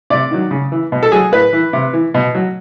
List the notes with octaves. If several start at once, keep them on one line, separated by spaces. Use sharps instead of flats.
C3 D5
D#3 F#3
C#3
E3
B2
A4
F#3 G#4
A2 B4
E3
C3
E3
B2
F#3